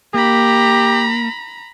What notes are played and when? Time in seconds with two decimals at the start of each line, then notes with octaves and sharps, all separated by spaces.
0.14 A#3 G4 A#5 B5